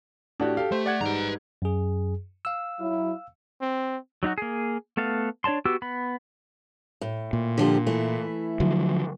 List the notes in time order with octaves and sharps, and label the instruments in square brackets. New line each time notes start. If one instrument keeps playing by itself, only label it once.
[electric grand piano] A2 [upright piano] D4 F#4 G4
[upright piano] G4 A4 [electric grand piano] F5
[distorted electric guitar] A3 [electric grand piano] C5
[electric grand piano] D5 F#5 G#6
[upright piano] G#2 G3 [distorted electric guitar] B4 A#5
[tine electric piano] F#2 G#4
F5 E6
[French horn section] F#3 E4
[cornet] C4
[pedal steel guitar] F#3 D#4 E4 F#4
A#3 G#4
A3 B3 A4 F5
D4 C#5 D5 A5 C6
B3 F#4 G4 D6 E6
B3 B5
[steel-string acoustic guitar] A2
[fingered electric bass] A#2
[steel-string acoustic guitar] D3 F3 G4
E3 A3 E4
[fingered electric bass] D3 F3 F#3